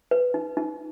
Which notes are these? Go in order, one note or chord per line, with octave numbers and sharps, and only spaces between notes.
B4
D#4
D#4